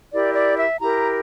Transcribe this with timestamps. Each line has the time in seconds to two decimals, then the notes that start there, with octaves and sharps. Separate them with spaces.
0.12 E4 G4 A#4 D5
0.34 D5
0.57 E5
0.78 E4 G4 A#4 A#5